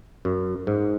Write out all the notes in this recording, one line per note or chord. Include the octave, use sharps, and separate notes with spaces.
F#2
G#2